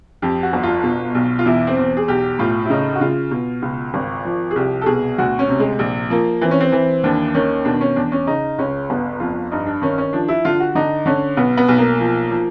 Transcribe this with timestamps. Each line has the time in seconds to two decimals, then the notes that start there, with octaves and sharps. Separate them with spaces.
0.22 F2 G4
0.43 F#4
0.53 G1
0.63 F4
0.83 B2
1.15 B1
1.39 F4
1.45 E2 E4
1.67 C4
1.77 E2
1.97 G#4
2.08 B1 G4
2.39 A2 F4
2.65 E4
2.70 C#3 D#4
2.95 F#4
3.01 C#3 F4
3.31 B2
3.62 C#2
3.94 G#1
4.25 F3
4.51 G#4
4.56 C2 G4
4.81 A4
4.86 B2 G#4
5.18 D2 F#4
5.39 C#4
5.49 C3
5.60 G#3
5.79 A#1
6.10 F3 A#3
6.41 E3 C4
6.51 C#4
6.61 C4
6.72 E3
7.03 D#2 D4
7.34 D#3 C#4
7.65 B2 D4
7.81 C#4
7.96 E2 D4
8.12 C#4
8.27 C#3 D#4
8.58 C#2 C#4
8.90 G1 B3
9.20 F2 F4
9.51 G2 D#4
9.66 D4
9.82 D#3 C#4
9.98 C#4
10.13 F3 D4
10.28 E4
10.45 D3 F4
10.60 F#4
10.75 D3 D#4
11.06 D3 C#4
11.37 B1 B3
11.57 B3
11.69 B1
11.78 A#3
11.99 F3
12.31 F3